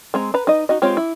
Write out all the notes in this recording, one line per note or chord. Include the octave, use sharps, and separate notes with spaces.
G#3 C4 A#5
B4 A#5 B5
D#4 D#5
D#4 F#4 D#5
G#3 C4 F4 G4 C#5
E4